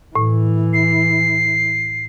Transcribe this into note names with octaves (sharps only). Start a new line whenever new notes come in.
A2 E3
C7